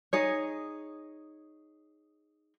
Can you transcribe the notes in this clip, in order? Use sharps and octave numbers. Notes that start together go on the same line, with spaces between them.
D#4 G#4 C#5